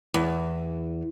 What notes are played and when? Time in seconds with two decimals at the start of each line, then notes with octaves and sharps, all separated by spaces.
0.14 E2